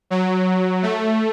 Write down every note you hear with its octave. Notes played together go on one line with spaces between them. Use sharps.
F#3
A3